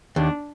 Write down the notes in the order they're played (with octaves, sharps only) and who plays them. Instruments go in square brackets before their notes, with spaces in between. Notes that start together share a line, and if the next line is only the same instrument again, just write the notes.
[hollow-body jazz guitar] D#2 [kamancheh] D4